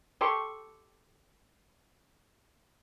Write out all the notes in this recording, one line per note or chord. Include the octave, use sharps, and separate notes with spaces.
G4 A4 C6 C#6